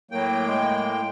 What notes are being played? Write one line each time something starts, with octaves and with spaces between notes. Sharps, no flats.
A2 F#3 A#3 G5
G#3